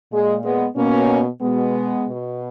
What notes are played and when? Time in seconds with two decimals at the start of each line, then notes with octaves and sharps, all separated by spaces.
0.11 A#2 G#3
0.43 G#3 B3
0.76 B2 A#3 C#4
1.40 B2 G#3 B3
2.05 B2